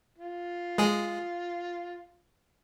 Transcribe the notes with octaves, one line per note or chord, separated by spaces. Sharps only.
F4
G#3 G#4